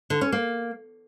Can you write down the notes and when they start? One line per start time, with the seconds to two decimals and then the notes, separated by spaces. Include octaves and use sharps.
0.10 D3
0.21 C#4
0.32 A#3